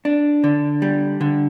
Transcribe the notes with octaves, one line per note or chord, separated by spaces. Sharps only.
D4
D3
G3
D3